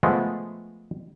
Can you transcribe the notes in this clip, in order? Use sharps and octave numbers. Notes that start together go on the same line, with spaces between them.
F3 G#3 A3 B3